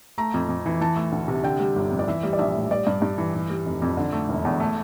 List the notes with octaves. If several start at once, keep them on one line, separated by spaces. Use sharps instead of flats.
A3 A#5
F2
F2
E3
E3 A5
A3
D2
C3
D3 G5
G3
G1
F2
D5
E3 E5
G3
D5
A#1 E5
A2
G3 D5
G2
G2
E3
E3
G3
F1
F2
D3
A3
E1
E2
A3